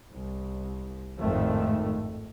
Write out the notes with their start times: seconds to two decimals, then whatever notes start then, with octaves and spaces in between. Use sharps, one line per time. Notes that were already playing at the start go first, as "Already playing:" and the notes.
0.11 C2
1.19 G#1 F2 A2 D#3 A3